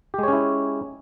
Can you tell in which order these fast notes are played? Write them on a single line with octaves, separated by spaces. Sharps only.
G4 G#3 C#5 C#4 E4